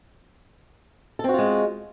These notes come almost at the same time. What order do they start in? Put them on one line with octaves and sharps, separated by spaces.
A4 C4 F#4 F4 G#3